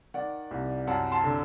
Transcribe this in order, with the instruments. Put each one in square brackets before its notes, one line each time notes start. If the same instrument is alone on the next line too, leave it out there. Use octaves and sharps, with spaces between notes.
[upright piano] D#3 D5 F#5
C2
F#2 F#5 A5
A5 C6
D3